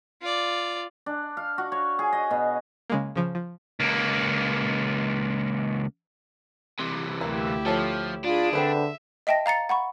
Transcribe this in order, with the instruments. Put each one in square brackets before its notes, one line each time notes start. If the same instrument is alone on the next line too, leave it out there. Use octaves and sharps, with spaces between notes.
[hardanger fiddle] F4 D5
[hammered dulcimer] D4
F5
F#4
C#5
G#4
D#5
B2
[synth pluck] C#3 G#3 A#3
C#3 F3
F3
[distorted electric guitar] C#2 A#3
[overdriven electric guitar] C3 E3
[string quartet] D2 E4 G4 [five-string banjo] A#3
[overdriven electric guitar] F3 [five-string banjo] A4 C#5 A5
[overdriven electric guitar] D4 [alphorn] F4 [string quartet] G#4 B5 D#6
[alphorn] D3 [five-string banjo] C4 B4 C5 [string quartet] E5
[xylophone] D#5 E5 G5 A5 A#6
F5 A#5 A6 C#7
F#5 B5 C#6